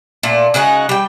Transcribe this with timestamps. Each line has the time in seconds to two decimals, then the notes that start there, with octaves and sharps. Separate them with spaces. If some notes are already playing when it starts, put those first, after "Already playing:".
0.23 A#2 A3
0.54 C#3 G#3 D#4 F#4
0.89 G3 G5